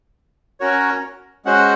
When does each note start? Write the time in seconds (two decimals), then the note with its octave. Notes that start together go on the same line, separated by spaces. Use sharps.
0.60 C#4 F#4 A#4 C#5
1.45 G#3 C#4 F#4 C5 F#5